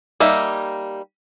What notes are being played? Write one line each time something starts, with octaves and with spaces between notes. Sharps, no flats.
G3 A#3 D#4 E5